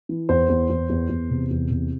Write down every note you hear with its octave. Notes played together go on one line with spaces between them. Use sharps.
E3
E2 C5
E2
E2
E2
E2
C3
E2
C3